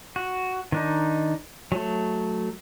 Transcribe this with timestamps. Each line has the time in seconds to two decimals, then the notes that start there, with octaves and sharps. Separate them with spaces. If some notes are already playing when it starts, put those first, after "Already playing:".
0.16 F#4
0.72 D#3 D4 D#4
1.72 F#3 A3